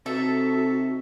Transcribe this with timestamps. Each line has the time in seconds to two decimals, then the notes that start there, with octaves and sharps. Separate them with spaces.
0.06 C3 D#4 F#4 A4 E5